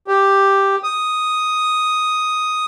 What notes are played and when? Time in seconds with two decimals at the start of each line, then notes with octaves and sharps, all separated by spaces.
0.08 G4
0.84 D#6